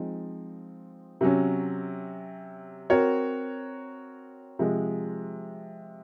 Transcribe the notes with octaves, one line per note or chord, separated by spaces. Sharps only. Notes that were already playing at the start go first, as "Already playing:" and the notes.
Already playing: F3 G#3 C4 D#4
C3 F#3 C#4
C4 F#4 A#4 C#5
C3 F3 G#3